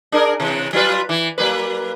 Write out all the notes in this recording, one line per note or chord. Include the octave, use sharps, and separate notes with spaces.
D4 G#4 A#4
C3 E3
F#3 F4 B4
E3
F#3 A#3 B4